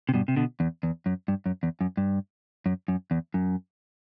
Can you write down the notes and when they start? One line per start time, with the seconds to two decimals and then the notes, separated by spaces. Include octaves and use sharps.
0.09 C3
0.14 G2 B2
0.28 C3
0.36 B2 D3
0.60 E2
0.83 E2
1.06 F#2
1.28 G2
1.46 F#2
1.63 E2
1.81 F#2
1.97 G2
2.66 F#2
2.88 F#2
3.11 E2
3.34 F#2